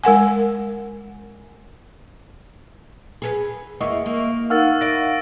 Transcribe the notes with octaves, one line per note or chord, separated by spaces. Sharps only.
G#3 A#4 F#5 G#5
G#4 A4 B4
E2 A#3 E4 D#5 E5 C#6
A#3
D#4 A#4 F5 F#5 C#6 E6 A6
E4 D5 A#6 D7